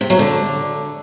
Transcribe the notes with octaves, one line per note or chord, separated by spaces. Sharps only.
C3
F#3
D3